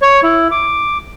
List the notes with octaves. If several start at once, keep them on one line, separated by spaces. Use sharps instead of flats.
C#5
E4
D6